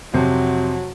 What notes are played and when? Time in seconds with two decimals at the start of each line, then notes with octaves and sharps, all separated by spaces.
0.14 F2 C3 F#3